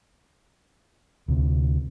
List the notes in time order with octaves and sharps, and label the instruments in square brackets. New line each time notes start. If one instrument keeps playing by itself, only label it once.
[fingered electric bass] D2 C3